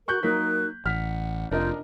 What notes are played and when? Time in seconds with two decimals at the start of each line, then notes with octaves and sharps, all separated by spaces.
0.08 F#4 A#4 C#6 F#6 G6
0.23 F#3 A#3 D#4 A#4 F#6 B6
0.86 A1 F#5 F6 B6
1.51 F1 D4 F4 A#4 D#5 G6